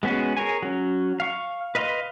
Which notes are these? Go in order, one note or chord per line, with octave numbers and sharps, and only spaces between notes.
G#3 B3 C#4 F#4 G#4
G#4 A#4 C#5 G#5
F#3 C#4
F5 C#6
B4 D#5 F5 B5 C6